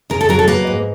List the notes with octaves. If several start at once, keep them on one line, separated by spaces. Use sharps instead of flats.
C#3 A#4
A4
F#3 A#4
A4
A#3 B4
G#2